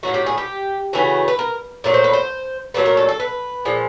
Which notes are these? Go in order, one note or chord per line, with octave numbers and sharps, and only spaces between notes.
A2 F#3 A3 F#4
G4
G#4
G4
C#3 E3 A3 F#4
B4
A#4
A#2 F#3 A3
C5
B4
C5
A#2 F#3 A3 B4
A#4
A4
A4
B4
A#2 F3 G#3